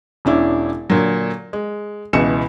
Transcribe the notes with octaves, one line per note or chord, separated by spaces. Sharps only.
E1 C#4 D4 E4
A#2 D3 F#3
G#3
C#2 B2 E3 C#7 E7